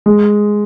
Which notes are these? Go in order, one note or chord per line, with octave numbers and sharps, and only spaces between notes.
G#3